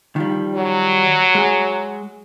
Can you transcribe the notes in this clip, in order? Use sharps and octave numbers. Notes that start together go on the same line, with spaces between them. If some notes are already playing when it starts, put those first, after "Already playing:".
D#3 F3 G3
F#3
G#3 G#4